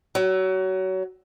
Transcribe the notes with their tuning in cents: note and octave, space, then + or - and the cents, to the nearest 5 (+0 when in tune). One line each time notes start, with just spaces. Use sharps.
F#3 +25